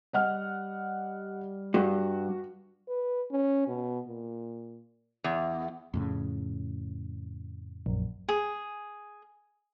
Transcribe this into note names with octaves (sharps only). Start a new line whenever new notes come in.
G3 D#5 F#5 F6
G2 F#4
B4
C#4
B2
A#2
E2
F2 A2 C#3
A#1 F#2
G#4